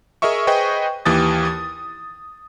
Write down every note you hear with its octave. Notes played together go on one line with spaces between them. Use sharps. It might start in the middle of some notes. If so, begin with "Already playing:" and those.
G#4 A#4 D#5 E5 C#6
G#4 B4 C5 D#5 G5 C#6
D#2 E3 G4 D#6 A6
D#6